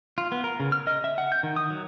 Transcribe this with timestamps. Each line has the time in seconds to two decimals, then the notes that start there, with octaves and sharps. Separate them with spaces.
0.18 F4
0.32 B3
0.44 A#4
0.60 C#3
0.72 F6
0.87 D#5
1.04 E5
1.18 F#5
1.32 G6
1.43 D#3
1.56 D#6
1.70 F#3